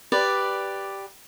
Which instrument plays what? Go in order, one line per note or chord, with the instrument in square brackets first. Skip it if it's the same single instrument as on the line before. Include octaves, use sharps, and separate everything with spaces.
[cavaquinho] G4 B4 D5